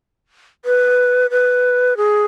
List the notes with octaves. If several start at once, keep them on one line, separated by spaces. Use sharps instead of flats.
B4
B4
G#4